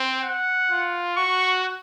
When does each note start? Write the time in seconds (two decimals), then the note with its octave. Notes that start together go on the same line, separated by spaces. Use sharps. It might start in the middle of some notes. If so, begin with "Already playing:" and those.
Already playing: C4
0.22 F#5
0.70 F4
1.17 F#4 C#6